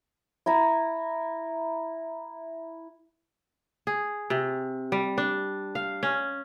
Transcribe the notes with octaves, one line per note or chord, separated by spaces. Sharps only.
E4 E5 A#5
G#4
C3
G3
D4
F5
C#4